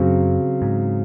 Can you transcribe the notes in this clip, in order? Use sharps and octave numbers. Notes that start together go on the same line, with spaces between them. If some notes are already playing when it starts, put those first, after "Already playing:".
Already playing: F#2 C#3 F#3 C4
G#2